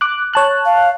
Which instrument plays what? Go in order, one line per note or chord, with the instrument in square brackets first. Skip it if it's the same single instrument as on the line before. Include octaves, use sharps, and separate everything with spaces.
[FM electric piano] D6 F#6
C#5 A5 F#6
[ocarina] F5